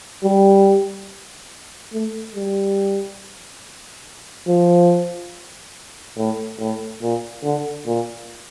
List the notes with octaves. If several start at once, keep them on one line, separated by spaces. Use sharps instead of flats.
G3
A3
G3
F3
A2
A2
A#2
D3
A#2